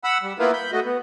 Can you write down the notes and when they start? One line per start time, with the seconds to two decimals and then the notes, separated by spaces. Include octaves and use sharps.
0.04 F#5 B5 E6
0.23 G3
0.39 A#3 B3 E4 F4 A#4 B4
0.53 B5 G6
0.72 A3 F#4 D#5
0.85 B3